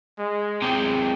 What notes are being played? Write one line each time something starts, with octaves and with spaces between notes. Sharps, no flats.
G#3
C3 G#3 G5